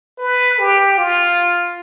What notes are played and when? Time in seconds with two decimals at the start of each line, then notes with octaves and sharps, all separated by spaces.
0.18 B4
0.59 G4
0.98 F4